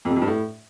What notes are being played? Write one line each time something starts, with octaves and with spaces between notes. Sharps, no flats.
F2
C3
F2
G2
A2